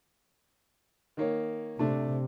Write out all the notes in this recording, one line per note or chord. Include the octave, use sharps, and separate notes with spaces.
D#3 A#3 C#5
C3 A3 D4 D5